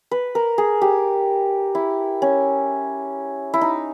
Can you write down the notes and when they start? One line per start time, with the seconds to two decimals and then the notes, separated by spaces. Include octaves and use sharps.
0.11 B4
0.35 A#4
0.58 G#4
0.82 G4
1.75 E4
2.22 C#4
3.54 E4
3.61 D#4